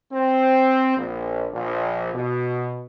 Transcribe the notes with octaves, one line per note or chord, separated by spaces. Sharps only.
C4
A#1
A#1
B2